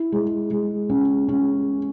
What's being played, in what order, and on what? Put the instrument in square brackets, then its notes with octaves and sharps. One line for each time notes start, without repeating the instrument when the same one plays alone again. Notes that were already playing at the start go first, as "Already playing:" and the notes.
Already playing: [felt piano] E4
G#3
G#3
C#4
C#4